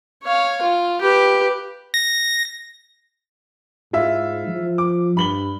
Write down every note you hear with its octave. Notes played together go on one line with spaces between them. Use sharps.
C#5 F5
F4
G4 B4
A#6
G#2 E4 F4 E5
F3
D6
G2 B5 F#7 G7